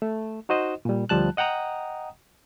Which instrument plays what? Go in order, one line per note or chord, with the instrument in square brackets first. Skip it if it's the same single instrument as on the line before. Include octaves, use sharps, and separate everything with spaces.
[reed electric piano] A3
D#4 F#4 C5 D#5
A#2 G3
D2 F3 G3 A5 F#6
D#5 F#5 G5 A#5 D#6